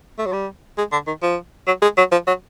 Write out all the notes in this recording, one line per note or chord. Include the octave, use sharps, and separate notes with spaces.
A3
F#3
G3
G#3
D3
D#3
F3
F#3
G#3
F#3
F3
F#3